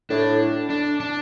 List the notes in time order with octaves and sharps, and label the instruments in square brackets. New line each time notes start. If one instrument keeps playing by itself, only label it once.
[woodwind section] A2 [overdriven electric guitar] D4
[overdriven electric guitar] D4
D4